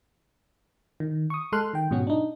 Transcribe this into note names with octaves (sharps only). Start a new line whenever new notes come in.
D#3
C#6 D#6
G#3 A4 C6 F6 F#6
D#3 G5
G#2 B2 F#3 C#4 F#4
D4 D#4